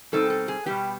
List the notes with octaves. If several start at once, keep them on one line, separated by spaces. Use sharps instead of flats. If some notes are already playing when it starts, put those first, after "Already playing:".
B2 G3 C4 D#4 A4
A4
G#4
B2 G3 B3 G4